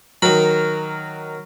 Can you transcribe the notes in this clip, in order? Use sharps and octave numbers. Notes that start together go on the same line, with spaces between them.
D#3 F#3 A#4 B5